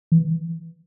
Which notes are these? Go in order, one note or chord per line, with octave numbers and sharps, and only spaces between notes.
E3